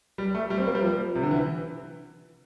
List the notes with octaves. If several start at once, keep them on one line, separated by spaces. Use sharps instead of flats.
G3
A3
G3
C4
A#3
G3
F3
C3
D3
E3